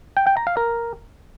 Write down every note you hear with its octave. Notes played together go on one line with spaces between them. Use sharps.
G5
G5
A#5
F5
A#4